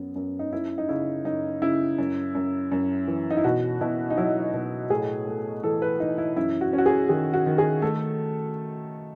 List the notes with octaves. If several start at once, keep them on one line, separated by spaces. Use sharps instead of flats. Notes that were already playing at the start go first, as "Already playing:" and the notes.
Already playing: F#2 B3
F#2
D#4
F#2 E4
D#4
C#3 E4
F#2 D#4
C#3 E4
F#2
F#2
F#2
E3
D#4
E4
B2 F#4
B2 E4
D#4
F#3 E4
B2
A2 G#4
A3
E3 A4
B4
E3 D#4
E4
F#2 E4
F#4
C#4
F#4
G#4
D#3 G#4
F#4
D#3
G#4
A3 A4